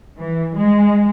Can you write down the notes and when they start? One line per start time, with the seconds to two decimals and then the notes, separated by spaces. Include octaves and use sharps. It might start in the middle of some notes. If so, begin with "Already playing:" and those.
0.19 E3
0.59 G#3